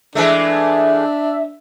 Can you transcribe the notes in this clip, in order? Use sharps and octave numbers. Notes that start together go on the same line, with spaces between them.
E3 G#3 A3 D4 E5